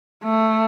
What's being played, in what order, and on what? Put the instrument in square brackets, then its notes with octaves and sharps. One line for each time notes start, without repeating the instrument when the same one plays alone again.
[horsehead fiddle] A3